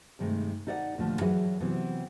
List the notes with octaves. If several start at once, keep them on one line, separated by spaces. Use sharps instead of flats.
G2 C3 D#3 G#3 A3
D#4 A4 D5 E5 F#5
D#2 A#2 D3 F3 A3
E3 F#3 G#4 B4 E5
C3 E3 F#3 B3 C4